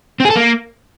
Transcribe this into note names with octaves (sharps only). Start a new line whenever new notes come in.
C4
G#4
A4
A#3